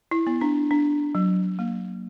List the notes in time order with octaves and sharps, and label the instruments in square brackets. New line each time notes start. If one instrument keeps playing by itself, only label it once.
[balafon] E4
B3
D4
D4
F#3
A#3